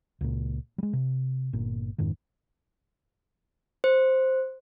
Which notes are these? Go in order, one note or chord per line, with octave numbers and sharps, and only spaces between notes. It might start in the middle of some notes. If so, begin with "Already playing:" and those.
C#2 A#2
G3 G#3
C3
G1 A#2
F2 G#2 D#3
C5